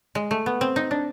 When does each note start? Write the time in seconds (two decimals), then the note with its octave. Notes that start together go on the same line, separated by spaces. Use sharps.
0.15 G#3
0.31 A3
0.46 B3
0.61 C4
0.76 D#4
0.91 D4